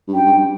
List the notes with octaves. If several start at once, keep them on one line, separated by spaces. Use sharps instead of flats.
G2
F#2 G5
G2